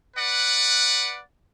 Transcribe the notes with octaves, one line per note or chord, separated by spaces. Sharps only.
B4 D5 F#5